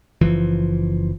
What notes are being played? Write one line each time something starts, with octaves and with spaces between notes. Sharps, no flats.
F#1 E3 F3